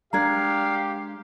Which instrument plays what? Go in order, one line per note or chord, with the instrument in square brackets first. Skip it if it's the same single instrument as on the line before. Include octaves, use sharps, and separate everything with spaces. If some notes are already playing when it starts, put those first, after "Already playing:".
[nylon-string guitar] G#3 D4 A#4 [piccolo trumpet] G4 [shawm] F5 [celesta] A#5 G#6